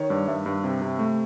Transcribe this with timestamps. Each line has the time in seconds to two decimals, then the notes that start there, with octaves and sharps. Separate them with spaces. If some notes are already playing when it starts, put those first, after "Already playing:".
Already playing: D#3 C#5
0.10 G2 D5
0.28 G2 E5
0.46 G2
0.64 C3
0.82 C3
0.99 A3